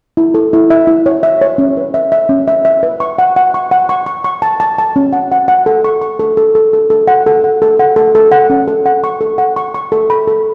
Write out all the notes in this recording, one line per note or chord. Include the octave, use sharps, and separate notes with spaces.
E4
A4
E4
E5
E4
C#5
E5
C#5
C#4
B4
E5
E5
C#4
E5
E5
B4
C#6
F#5
F#5
C#6
F#5
C#6
C#6
C#6
A5
A5
A5
C#4
F#5
F#5
F#5
A4
C#6
C#6
A4
A4
A4
A4
A4
F#5
A4
F#5
A4
F#5
A4
A4
F#5
C#4
A4
F#5
C#6
A4
F#5
C#6
C#6
A4
B5
A4